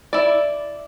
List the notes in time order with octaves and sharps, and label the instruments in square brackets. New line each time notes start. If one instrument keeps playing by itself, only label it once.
[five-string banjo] E4 D5